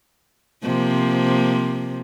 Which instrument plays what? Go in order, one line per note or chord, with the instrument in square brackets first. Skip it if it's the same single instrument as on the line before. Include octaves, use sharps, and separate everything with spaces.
[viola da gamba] C3 F3 A#3